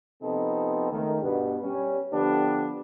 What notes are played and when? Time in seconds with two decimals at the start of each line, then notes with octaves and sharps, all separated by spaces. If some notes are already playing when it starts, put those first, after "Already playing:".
0.22 C3 F3 B3 C4 D#4 A4
0.91 C#2 D#3 A3
1.22 G2 B2 B3
1.63 G3 C#4
2.12 D3 F3 B3 D4 G4